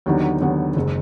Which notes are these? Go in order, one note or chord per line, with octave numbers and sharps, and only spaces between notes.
D#2 D3 F#3 B3 D#4
D#2 D3 F#3 B3 D#4
F#1 D#3 G#3